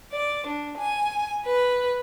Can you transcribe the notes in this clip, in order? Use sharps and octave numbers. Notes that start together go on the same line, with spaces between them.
D5
D4
G#5
B4